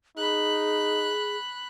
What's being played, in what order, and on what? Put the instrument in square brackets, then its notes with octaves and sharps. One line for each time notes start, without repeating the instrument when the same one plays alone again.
[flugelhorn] D#4 [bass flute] G#4 [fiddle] B5 F#6